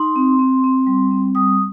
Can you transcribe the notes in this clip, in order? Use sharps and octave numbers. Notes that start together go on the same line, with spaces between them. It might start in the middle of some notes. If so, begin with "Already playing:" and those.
Already playing: D#4 C6
C4
C4
C4
G3
C4
G3 D#6